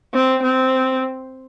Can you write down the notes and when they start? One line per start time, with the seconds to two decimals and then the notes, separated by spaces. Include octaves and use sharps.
0.14 C4
0.43 C4